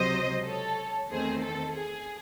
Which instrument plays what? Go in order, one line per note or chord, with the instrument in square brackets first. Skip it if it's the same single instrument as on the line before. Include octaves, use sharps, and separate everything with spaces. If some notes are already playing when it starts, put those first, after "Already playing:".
Already playing: [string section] C#2 C3 F#3 C5 D#5
A4 C#5
E2 D#3 A3 C4 G#4 C5
A4
G#4